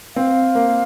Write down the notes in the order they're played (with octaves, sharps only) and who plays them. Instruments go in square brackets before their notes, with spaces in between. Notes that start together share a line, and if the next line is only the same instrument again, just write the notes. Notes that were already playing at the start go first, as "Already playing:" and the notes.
[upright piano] C4 [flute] F5
[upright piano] A#3